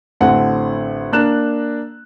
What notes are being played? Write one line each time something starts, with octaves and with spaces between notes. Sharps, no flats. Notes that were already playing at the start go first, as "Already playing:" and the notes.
A1 D3 C4 F#5
A#3 D4 A#5 F#6 E7